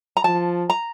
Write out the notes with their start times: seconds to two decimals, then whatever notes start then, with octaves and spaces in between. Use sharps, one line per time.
0.17 A#5
0.24 F3 A5
0.70 A#5